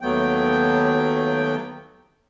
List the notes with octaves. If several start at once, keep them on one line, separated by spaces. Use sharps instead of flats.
D#2 F#3 A3 B3 G5